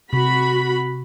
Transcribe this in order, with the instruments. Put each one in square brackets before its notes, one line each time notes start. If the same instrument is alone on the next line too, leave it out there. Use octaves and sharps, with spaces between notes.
[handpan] C3 [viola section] F#4 B5